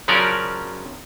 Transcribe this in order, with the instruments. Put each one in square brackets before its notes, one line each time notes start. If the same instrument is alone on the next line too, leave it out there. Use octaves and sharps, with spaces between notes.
[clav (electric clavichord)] C#3 F3 F#3 C#4 A#4 D5